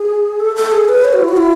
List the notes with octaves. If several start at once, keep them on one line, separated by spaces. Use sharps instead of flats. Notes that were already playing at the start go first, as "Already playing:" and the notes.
Already playing: G#4
A4
A4
G#4
B4
C#5
F#4
E4
F#4
E4